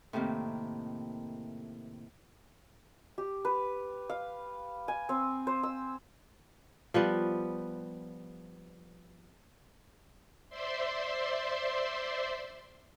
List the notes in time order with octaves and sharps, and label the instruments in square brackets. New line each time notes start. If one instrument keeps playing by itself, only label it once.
[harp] A2 C3 D#3 A#3
[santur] G4
B4
F5
G#5
C4
C5
E6
[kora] F3 G3 B3
[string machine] C5 D5 E5 C6